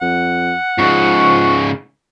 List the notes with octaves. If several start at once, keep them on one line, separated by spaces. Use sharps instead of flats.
F2 F#5
G#2 C#3 F3 C#6